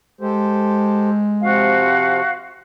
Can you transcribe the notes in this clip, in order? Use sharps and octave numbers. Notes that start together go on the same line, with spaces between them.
G#3 G4 A4 C5
C3 F3 C4 F#4 F5